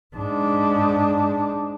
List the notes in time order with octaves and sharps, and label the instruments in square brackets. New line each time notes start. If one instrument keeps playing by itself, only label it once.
[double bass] G#2 D4